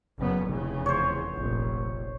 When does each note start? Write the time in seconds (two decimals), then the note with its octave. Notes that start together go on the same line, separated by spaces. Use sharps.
0.19 F#1 C#3 B3
0.48 F1 E2 C#3
0.86 C5 C#5
1.31 F1 A#1